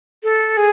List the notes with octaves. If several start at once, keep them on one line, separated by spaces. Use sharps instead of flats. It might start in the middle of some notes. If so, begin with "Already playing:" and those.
A4
G#4